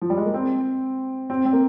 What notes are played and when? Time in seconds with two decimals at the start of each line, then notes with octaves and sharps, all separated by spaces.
0.01 F3
0.10 G3
0.18 G#3
0.25 A#3
0.34 C4
1.30 C4
1.45 C4
1.53 A#3